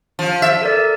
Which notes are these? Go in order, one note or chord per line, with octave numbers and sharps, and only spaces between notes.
F3
E5
A4 A#4 D5